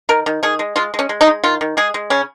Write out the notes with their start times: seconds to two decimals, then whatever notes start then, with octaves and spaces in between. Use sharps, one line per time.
0.09 D#3 A#4
0.26 D#3
0.43 D#3 G#4
0.59 G#3
0.76 G#3 F4
0.94 G#3
0.99 C#4
1.09 G#3
1.21 D#4
1.27 G#3
1.44 D#3 F4
1.61 D#3
1.77 G#3 G#4
1.94 G#3
2.10 C#3 C#4